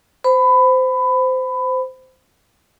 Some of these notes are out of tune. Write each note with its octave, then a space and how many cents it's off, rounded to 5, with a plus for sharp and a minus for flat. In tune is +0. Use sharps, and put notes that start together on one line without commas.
C5 -20 B5 +20